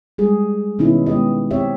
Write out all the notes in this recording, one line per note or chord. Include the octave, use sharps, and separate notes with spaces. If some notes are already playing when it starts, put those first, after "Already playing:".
G3 G#3 G#4
B2 D#3 B3 C#4 D#4 E4
G#3 B3 G4 D#5
C4 G4 C#5 E5